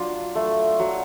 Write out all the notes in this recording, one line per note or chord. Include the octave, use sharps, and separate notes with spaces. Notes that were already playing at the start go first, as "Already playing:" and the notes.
Already playing: F#3 D4 F4
A3
F#3